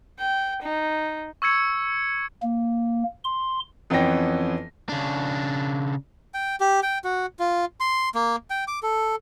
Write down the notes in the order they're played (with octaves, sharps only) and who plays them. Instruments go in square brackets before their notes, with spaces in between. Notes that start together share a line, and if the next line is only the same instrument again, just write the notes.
[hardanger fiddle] G5
D#4
[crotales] C#6 E6 G#6 C#7
[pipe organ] A#3
C6
[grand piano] F2 E3 B3 C#4 G5 A#6
[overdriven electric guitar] C#3 D4
[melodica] G5
G4
G5
F#4
F4
C6
A#3
G5
D6
A4